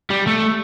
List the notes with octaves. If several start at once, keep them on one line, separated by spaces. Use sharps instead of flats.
G3
A3